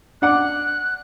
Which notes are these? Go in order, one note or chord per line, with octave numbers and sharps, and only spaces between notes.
D4 F#5 D6 F#6